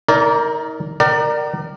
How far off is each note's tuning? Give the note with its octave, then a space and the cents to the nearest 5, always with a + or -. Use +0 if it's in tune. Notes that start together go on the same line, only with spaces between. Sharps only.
D#4 +35 A#4 +0 D5 -20
A#4 +0 D5 +25 G5 -45